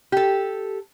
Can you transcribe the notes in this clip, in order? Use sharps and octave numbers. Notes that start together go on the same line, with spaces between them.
G4 A4